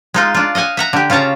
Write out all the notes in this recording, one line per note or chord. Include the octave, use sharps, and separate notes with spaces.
G#3 D#4 F4
D4 F4
D#5 F5 F#5 G#5
E5 F#5 A#5
D3 G4
C#3 F4 C#5 A5 A#5